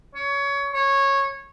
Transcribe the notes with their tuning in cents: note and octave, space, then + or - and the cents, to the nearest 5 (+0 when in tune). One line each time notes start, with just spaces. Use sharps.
C#5 +20
C#5 -15